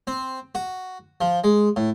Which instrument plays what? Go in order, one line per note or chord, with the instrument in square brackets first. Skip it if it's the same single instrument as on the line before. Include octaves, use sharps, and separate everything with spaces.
[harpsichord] C4
F#4
F3
G#3
A2